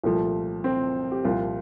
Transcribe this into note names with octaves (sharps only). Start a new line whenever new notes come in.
C2 A#2 F3 A3
C4
G4
C2 A#2 F3 F4